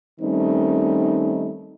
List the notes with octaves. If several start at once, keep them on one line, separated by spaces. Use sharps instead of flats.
D#3 G3 A3 C4 C#4 D#4